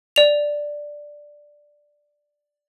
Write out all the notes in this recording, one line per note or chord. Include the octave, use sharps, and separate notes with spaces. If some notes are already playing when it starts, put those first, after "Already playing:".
D5 F7